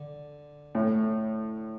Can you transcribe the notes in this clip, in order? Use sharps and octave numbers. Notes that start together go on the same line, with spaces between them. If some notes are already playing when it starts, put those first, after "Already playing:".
Already playing: D3
A2